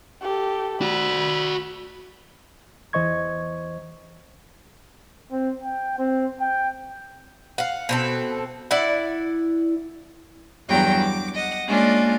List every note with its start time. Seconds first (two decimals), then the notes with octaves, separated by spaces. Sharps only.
0.22 G4 A4
0.82 F#4 D5 B5
2.93 E2 E3 C5 D#5 C#6 G#6
5.31 C4
5.64 G5
5.98 C4
6.41 G5
7.58 F5 F#5
7.89 B2 C4 A4
8.71 E4 D5 F#5
10.69 E2 G2 F#3 F#4 G5 A#5
10.99 D6
11.34 D#5 F#5
11.68 G#3 A#3 C#4 D4 F4 D5